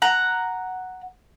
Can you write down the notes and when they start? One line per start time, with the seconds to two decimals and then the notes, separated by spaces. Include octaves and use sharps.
0.02 F#5 A#5